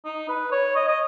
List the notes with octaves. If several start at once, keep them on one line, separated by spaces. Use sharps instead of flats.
D#4
B4
C#5
D#5
D#5